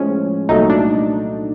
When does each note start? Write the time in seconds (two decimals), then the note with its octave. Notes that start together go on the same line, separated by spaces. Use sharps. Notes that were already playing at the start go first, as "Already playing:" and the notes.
Already playing: A2 F3 G#3 C#4
0.49 C2 A#2 F#3 A3 D#4
0.70 D4